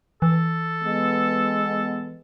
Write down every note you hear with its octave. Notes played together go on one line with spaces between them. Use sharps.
E3 A4
G#3 B3